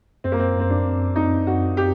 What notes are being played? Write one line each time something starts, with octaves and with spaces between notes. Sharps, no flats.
F#2 C4
A#3
C4
F#2 C4
D4
C4
C4 D#4
F#2 F#4
G4